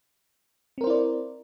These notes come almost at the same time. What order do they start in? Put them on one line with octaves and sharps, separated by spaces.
C4 A#4 C5 E4 D5